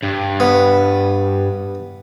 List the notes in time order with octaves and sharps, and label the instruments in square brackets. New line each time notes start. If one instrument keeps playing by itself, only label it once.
[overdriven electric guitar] G2
[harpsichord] B3